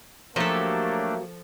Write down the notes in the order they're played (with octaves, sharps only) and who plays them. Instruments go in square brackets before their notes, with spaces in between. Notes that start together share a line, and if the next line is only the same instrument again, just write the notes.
[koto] F3 A4 [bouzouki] F#3 G4 C#5 [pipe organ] A3 D4 [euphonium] A#3